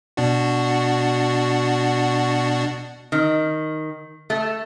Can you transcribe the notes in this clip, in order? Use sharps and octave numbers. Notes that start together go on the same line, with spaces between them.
B2 D4 F#4
D#3
A3